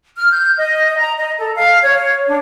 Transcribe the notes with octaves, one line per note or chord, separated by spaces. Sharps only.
F6
G6
D#5
A#5
D#5
A4
F5
C#5
D4